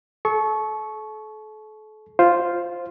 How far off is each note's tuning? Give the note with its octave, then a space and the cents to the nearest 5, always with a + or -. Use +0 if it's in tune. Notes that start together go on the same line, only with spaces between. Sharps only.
A4 -35 C#6 +0
F4 +0 C5 +0